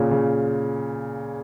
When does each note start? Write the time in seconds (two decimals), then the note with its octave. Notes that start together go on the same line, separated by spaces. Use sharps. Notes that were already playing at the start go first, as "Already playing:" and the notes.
Already playing: A#2 C#3
0.11 C#3